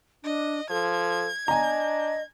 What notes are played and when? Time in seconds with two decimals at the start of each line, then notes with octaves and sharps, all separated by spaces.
0.24 D4 D#5
0.70 F3 A4 G#6
1.48 D4 D#5 G#5 A#5